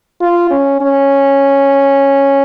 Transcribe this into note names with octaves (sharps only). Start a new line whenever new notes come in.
F4
C#4
C#4